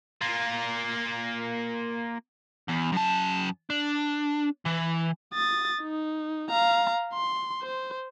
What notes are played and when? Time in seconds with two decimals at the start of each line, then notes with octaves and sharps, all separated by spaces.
0.21 A#3 F4
2.69 E2
2.93 F#2 A5
3.70 D4
4.66 E3
5.34 D#6 A6
5.83 D#4
6.50 F5 A#5
7.13 C6
7.62 C5